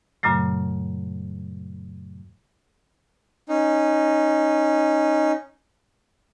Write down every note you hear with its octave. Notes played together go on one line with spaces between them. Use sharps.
F#2 A#2 C#3 F#3 A3
C#4 D#4